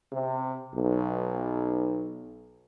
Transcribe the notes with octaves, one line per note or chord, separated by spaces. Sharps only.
C3
B1